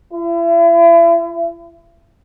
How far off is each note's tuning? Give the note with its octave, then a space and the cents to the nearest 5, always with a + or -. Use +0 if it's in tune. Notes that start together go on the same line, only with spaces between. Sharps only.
E4 +40